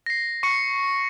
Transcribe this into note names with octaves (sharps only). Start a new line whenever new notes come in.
A#6 C7
C#6 C#7